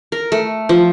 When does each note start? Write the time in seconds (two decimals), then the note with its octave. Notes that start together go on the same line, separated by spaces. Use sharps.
0.12 A#4
0.32 A3
0.69 F3